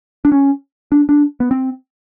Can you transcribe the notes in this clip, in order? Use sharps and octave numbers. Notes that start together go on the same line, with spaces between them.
D4
C#4
D4
D4
B3
C4